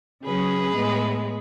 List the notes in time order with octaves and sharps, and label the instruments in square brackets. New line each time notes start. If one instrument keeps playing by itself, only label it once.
[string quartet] C#3 F#3 C#4 G#4 B4
A2 G#3 B3